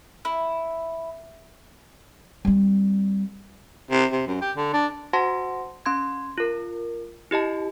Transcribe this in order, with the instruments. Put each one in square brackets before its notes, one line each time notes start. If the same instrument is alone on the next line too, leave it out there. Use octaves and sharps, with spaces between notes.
[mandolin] E4
[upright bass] G3 C4
[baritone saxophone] C3
C3
F#2
G4
D3
D4
[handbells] F#4 C5 F#5 A5 C6 A#6
C#4 C6 G#6
F4 A#4
E4 G4 D#5 A5